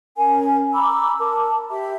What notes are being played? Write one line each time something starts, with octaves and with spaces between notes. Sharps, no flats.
C#4 A#4 G#5
A#5 B5 D6 E6
A#4 A5 D6
G4 E5